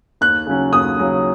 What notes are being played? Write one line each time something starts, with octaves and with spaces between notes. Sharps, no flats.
D#2 F#6
C#3 F#3 C#4
D#2 D#6
C#3 F#3 C#4